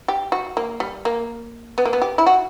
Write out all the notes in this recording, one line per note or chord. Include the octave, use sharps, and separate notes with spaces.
G4
F#4
A#3
G3
A#3
B3
A#3
B3
G4
E4
F#4